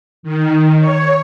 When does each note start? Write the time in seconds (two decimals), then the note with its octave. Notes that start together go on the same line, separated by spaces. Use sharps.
0.23 D#3
0.76 C#5